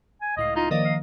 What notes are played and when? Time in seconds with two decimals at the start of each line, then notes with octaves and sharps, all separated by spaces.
0.22 G#5
0.37 C#2 A2 D#5 F5
0.56 D#4 F4
0.71 D#3 F3 A#3 D5 D#5
0.84 F5